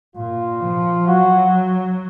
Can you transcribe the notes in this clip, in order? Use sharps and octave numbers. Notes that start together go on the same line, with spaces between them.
A#2 F4
F3
F#3 F#4